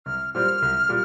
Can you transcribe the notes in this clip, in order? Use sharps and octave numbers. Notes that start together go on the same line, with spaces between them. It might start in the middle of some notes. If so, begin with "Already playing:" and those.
C2 F6
A#2 G3 C4 F6
C2
A#2 G3